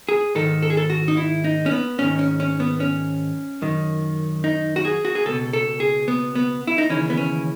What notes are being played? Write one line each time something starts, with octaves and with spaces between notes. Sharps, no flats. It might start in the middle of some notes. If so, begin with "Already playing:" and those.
G#4
G#2 D#3 A4
A4
G#4
A4
F#4
D#4
E4
D#4
C#4
B3
G#2 D#3 C#4
C#4
C#4
B3
C#4
F#2 D#3
D#4
F#4
G#4
F#4
G#4
C#2 B2 A4
A4
G#4
B3
B3
E4
D#4
D#2 C#3 E3 C#4
B3
C#4